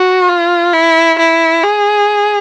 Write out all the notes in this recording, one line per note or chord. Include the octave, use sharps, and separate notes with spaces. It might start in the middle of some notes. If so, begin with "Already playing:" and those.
Already playing: F#4
F4
E4
E4
G#4